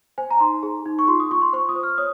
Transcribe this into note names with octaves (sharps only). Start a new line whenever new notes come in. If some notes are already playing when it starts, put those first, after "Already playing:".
C5 G#5
A#5
D#4 C6
G#4
D#4
C#6
F4 C6
D#6
F4 C#6
C6
C5 C#6
D#6
C5
F6
C#5 D#6